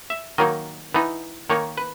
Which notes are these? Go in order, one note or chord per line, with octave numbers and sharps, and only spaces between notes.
E5
D#3 F#3 A#3 D#4 D#5
E3 B3 D#4
D#3 A#3 D#4 C#5
B4